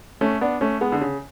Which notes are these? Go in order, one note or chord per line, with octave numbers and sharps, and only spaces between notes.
A3 C#4
B3 D4
A3 C#4
G#3 B3
D3
C#3